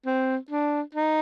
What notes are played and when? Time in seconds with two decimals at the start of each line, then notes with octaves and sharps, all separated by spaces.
0.06 C4
0.51 D4
0.95 D#4